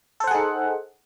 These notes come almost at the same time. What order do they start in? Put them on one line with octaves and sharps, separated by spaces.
A4 C5 F#5 G#4 D#4